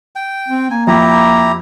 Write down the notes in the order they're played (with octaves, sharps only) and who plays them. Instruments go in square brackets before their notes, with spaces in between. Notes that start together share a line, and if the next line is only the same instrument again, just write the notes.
[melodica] G5
[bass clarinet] C4
[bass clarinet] A#3 [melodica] G#5
[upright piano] F2 F3 [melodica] E4 G4 A#5